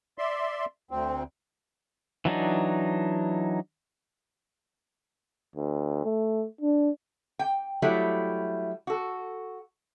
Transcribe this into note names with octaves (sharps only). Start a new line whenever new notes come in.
D5 E5 C6
D2 C4
E3 F#3 D4 D#4
D2
A3
D4
G5
F#3 G3 A3 E4
F#4 A4